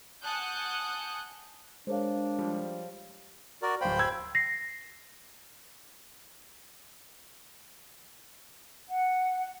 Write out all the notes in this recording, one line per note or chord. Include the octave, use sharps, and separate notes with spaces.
F#5 G#5 A5 D#6 F#6 G6
G#3 D4 G#4 A#4 C5 C#5 F5
F3 G3
F#4 A#4 D5
D1 C5 F5 G5 B5
E6 G#6
A#6 C7
F#5